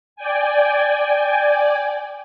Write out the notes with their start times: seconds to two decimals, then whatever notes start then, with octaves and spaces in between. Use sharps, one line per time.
0.16 D5 G5 G#5